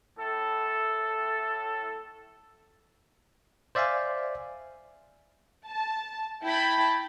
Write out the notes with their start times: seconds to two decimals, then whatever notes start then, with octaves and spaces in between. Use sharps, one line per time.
0.18 A2 A4
3.75 C5 D5 E5 F5 G#5
5.69 A5
6.44 E4 G5 A5 B5